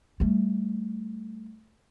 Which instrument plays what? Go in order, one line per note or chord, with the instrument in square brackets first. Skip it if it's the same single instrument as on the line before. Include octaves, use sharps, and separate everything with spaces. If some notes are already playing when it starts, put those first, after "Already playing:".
[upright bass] G3 A3